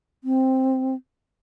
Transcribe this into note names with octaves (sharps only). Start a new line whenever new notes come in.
C4